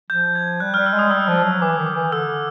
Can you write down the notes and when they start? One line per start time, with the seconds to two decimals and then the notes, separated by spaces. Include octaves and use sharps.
0.10 F3 G6
0.35 G#6
0.60 G3 F#6
0.74 G3 F6
0.86 E6
0.94 G#3
0.99 D#6
1.10 G3 E6
1.28 F3
1.36 F6
1.44 F#3
1.61 E3 D6
1.78 D#3
1.86 D6
1.95 E3
2.12 D3 E6